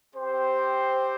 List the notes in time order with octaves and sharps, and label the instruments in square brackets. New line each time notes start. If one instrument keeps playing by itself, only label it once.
[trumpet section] C4 G4 C5